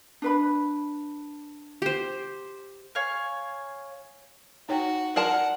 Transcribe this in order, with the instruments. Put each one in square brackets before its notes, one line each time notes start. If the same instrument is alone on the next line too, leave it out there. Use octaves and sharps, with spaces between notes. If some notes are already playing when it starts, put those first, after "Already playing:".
[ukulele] D4 B4 B5
[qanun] G4 C5
[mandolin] C#5 F5 G#5
[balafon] D#4 C#5 G5 [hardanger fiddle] F#4
[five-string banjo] G#4 A#4 A5 [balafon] D5 C6 [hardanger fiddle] F#5